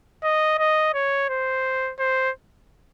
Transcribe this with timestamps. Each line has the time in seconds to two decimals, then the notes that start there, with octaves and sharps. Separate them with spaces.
0.23 D#5
0.58 D#5
0.94 C#5
1.29 C5
1.99 C5